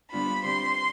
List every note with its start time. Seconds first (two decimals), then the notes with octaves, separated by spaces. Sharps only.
0.11 D3 G3 B3 D4 F4 B5
0.44 D3 G3 C4 C6